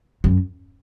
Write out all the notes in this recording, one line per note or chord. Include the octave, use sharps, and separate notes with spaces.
F#2